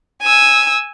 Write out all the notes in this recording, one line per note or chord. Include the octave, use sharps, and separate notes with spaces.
G#5 E6